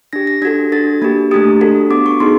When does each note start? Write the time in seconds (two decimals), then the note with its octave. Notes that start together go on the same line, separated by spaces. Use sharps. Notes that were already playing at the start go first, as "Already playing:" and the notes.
0.13 D4 G4 A#6
0.27 A#6
0.42 D4 F#4 A4 G#6
0.72 D4 F#4 A4 A6
1.02 A#3 D4 G4
1.31 A3 D4 G4 D#6
1.61 D4 F#4 A4
1.90 B3 D4 F#4 D6
2.06 C#6
2.20 B3 D#4 G#4 C6